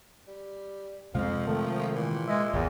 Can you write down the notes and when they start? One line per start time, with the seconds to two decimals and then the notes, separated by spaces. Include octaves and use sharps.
0.28 G3
1.15 F2 C3 F3 G#3 C4 F5
1.47 D#3 A3
1.96 A#2 E3
2.28 G#3 E5
2.53 G#1 E2 E3